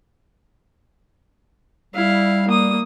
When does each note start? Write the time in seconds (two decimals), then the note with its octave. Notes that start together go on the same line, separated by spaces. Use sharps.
1.95 G3 E4 F5
2.48 A#3 D#6